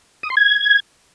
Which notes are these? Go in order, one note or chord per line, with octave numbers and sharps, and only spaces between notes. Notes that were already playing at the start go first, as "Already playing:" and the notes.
D#6
C6
G#6